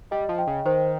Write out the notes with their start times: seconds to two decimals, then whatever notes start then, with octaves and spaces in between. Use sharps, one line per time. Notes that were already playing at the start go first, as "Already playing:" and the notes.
0.11 G3 D#5
0.29 F3
0.38 G5
0.47 C#3
0.65 D#3 C5